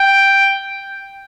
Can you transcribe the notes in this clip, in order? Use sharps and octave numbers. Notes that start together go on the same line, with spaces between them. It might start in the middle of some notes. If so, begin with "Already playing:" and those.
Already playing: G5